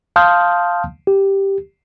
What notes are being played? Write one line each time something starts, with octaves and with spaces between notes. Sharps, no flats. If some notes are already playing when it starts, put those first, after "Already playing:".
F5 A5 C6 D#6 F6 G6
G4